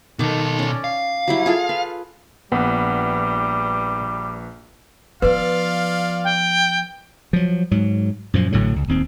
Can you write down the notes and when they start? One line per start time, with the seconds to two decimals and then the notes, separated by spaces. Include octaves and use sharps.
0.19 B2 D#3 A4 D6
0.59 C#4 D5
0.84 F5
1.27 F#3 G3 E4
1.46 F4 G#4 A4
1.69 B4
2.52 A#1 G3 B3 B4
5.22 F3 B3 F4 B4 D5 F5
6.24 G5
7.33 F3 F#3
7.71 G#2 F#3
8.34 F#2 A#2 F3
8.52 A1 A2 D3 F#3
8.76 C#2
8.88 D1 D#2 C4